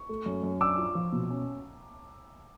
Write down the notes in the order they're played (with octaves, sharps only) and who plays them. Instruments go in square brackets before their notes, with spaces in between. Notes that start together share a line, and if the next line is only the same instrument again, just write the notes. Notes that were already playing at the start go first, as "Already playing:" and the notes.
Already playing: [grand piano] C#6
[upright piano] A3
F#2
F#2
[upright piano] D4 [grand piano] D6 E6
[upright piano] F4
F3
B2
C#4